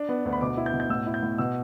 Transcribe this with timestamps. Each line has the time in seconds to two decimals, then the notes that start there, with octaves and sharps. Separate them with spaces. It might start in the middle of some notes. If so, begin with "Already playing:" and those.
Already playing: D4
0.09 B3
0.25 D2
0.33 B5
0.41 B2 D6
0.57 E4
0.66 G6
0.74 B2
0.80 G6
0.90 A2 E6
1.07 E4
1.14 G6
1.23 A2
1.38 B2 E6